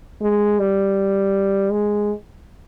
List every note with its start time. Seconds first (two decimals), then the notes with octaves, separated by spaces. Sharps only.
0.22 G#3
0.59 G3
1.71 G#3